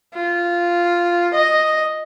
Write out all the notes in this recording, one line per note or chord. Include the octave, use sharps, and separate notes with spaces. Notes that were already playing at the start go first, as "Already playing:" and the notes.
F4
D#5